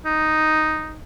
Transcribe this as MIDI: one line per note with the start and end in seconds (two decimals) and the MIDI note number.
0.05 1.00 63